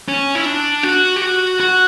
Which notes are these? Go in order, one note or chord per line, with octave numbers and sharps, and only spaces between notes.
C#4
E4
D4
F#4
G4
F#4
F#4